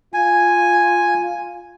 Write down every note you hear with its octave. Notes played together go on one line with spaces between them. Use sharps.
F4 G#5